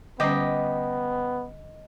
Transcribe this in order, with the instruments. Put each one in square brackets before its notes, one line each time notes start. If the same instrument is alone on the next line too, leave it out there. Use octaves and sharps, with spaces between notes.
[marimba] D3 G3 C#4 [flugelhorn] B3 [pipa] G4 [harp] D#5